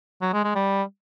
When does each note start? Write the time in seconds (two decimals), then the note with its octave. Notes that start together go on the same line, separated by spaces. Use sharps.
0.21 F#3
0.33 G#3
0.44 G#3
0.55 G3